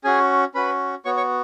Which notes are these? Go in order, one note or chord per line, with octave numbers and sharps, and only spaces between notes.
C#4 F#4 G#4 G#5
C#4 F#4 B4 B5
B3 F#4 C#5 C#6
C#5 C#6